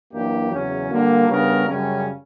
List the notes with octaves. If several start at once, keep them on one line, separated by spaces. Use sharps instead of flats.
F#2 E3 A#3 D4 G4
E2 C#3 F#3 C#4
D3 G3 A#3 D4 F#4
C#3 G3 B3 D4 A#4
F#2 C#3 G3 C#4